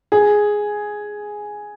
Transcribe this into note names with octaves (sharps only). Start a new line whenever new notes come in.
G#4